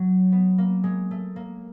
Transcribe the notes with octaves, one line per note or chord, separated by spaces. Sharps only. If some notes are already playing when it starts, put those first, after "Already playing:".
Already playing: F#3
B3
A#3
G#3
A3
A#3